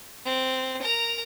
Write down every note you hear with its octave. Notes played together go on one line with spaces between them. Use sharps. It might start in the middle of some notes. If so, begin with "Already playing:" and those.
C4
A#4 A#5